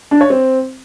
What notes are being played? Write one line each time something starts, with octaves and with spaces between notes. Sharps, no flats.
D4
C#5
C4